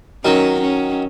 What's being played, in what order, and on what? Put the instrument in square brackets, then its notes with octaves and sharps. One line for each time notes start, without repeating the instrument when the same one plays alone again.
[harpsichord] D#3 F#3 [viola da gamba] C#4
[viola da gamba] C#4